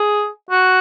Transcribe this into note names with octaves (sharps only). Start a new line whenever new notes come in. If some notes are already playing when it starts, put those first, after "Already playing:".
Already playing: G#4
F#4